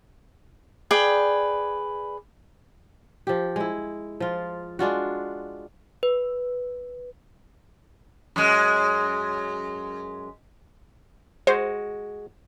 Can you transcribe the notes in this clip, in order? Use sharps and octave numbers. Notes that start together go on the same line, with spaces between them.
G#4 B4 D5 G5
F3 G4
G#3 E4
F3 F4
G#3 D4 F4 F#4
B4
F#2 G#3
G#3 F#4 C5